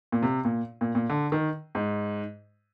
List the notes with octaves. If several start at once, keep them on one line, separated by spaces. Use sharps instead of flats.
A#2
C3
A#2
A#2
A#2
D3
D#3
G#2